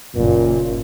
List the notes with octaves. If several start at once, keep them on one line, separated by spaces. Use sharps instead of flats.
F#1 A#2